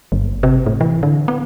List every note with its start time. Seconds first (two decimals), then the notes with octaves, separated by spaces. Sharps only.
0.12 G1
0.43 C3
0.66 A2
0.81 E3
1.03 D3
1.28 B3